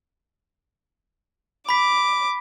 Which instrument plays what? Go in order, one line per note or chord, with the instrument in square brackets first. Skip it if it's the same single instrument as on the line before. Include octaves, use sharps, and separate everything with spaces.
[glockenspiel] B5 B6 [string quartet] D6